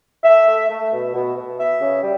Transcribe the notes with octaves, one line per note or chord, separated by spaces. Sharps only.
A3 E5
A3
A3
B2
B2
B2
B3 E5
C#3
G3